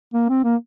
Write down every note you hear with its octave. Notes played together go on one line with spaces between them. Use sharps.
A#3
C4
A#3